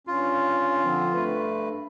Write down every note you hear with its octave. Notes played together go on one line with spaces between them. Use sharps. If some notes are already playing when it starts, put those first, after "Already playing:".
G2 C#4 F4
D3 F3 C4
G2 A3 B4